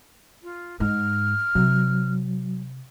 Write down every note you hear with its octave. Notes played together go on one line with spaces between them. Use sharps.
F4
G#2 F6
C3 F#3